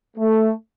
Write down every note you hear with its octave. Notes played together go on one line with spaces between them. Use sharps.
A3